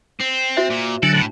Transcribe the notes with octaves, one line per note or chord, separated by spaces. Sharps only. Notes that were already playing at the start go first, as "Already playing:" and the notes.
C4
F#4 C5 E5
A#2
D3 F#3 D4 A4
A2